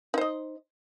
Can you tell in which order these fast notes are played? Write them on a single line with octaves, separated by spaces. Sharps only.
D#4 C5 D#5